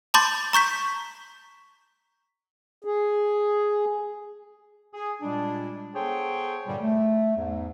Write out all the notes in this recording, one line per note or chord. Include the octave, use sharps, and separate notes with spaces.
A5 B5 C6 D6 G6 A6
A#5 C#6 G6 B6
G#4
G#4
A#2 G3 G#3 D4
B3 G#4 A4 C5 C#5 G5
G2 A#2 D3 G3
A3
E2 G#2